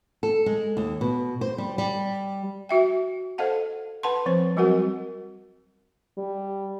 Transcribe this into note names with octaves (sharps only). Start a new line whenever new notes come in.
A4
G#3
D#2
B2
C5
G3
G3
F#4 E5 G5
A4 C5 D#5 F5 F#5 A5
B4 F#5 A5 B5 C6
F3 C4 C5
F#3 G3 C4 F#4 A#4 F#5
G3